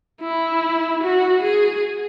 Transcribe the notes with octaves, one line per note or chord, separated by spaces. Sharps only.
E4
F#4
G#4